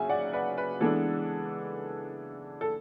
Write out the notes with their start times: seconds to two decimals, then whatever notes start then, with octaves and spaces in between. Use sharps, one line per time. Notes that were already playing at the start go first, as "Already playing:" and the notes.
Already playing: C#3 F#3 E5 G#5
0.09 D5 F#5
0.33 B4 D5
0.58 B4
0.80 E3 G#3 B3 D4 A4
2.61 A4